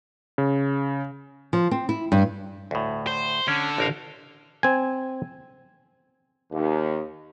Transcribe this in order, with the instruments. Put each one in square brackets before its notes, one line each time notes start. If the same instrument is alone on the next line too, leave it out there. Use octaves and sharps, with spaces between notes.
[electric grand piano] C#3
[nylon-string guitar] F3
C4
E4
G2
[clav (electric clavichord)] D2 A2
[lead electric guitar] C5
[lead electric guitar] D3 [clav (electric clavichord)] C#4
[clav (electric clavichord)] A1 A#4 F5
C4 G#5
[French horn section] D#2